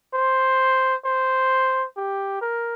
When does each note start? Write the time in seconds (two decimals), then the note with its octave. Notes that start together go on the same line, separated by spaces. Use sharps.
0.14 C5
1.05 C5
1.97 G4
2.41 A#4